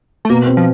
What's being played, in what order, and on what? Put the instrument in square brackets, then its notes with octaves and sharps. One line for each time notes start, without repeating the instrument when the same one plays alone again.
[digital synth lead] A3
[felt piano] B2 [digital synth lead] A#3
[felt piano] C4
[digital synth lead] F3